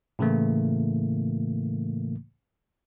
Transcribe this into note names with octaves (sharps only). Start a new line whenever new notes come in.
A2 C#3 E3 A3 A#3